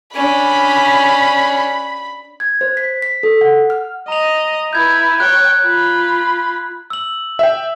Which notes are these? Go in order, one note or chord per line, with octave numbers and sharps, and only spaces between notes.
C#4 D4 B5
G#6
C5
B6
B6
A4
F#5
F6
D#5 A#5 F7
E4 B4 G6 G#6
C#5 G5 F#6
F4 B5
E6 F#7
E5 G5